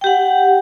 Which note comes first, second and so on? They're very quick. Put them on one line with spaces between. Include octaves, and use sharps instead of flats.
G5 G4 F#5